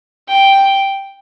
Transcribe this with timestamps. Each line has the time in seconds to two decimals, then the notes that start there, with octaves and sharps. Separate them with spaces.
0.28 G5